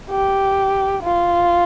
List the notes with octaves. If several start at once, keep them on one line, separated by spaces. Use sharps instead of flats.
G4
F4